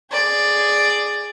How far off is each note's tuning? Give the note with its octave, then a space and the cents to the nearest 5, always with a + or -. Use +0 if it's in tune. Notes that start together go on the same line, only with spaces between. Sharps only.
G#4 +0 D5 +5